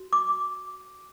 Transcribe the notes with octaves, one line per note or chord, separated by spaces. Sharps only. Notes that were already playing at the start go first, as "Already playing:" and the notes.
Already playing: F#4
D6